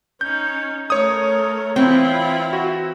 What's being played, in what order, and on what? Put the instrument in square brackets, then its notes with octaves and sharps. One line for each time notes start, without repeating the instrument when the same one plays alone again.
[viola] C#4 D#4 [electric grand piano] G6
[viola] A3 A#4 [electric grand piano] C#5 D#6
[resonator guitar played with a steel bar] E3 C4 [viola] E4 F4
[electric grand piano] F#4